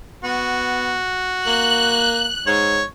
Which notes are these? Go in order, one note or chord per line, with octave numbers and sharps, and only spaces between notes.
B3 F#4
A#3 F#6
G#2 C#5